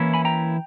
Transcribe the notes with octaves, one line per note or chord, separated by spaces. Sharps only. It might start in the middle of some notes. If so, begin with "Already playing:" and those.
Already playing: E3 A#3 C#4 E4
G#5 B5
G5 A#5